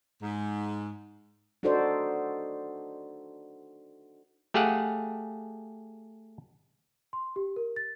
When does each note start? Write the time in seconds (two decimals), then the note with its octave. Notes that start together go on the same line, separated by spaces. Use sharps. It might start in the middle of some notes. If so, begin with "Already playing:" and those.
0.22 G#2
1.63 D4 D#4 F#4 A4 C5 D5
4.54 A3 G4 G#4 F5 F#5
7.13 C6
7.36 G4
7.56 A#4
7.76 A6